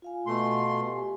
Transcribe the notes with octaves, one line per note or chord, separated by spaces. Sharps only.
F4 F5 G#5
B2 A3 C6
F5
G4 G#5